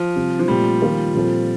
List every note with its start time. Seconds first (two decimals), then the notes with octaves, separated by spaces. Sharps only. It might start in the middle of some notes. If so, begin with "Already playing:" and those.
Already playing: F3
0.16 C3 G3 C4
0.39 F3
0.48 A#2 G3 A3 C4
0.82 D#3 A#3 F4 A#4
1.15 A#2 F3 C4 F4 A4